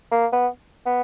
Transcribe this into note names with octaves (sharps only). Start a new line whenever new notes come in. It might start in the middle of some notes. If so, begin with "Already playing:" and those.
A#3
B3
B3